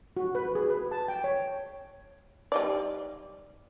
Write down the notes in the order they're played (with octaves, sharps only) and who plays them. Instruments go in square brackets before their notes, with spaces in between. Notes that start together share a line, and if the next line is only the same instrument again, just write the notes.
[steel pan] F#4
B4
G#4
B4
A5
G5
C#5
[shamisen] G3 D#4 D5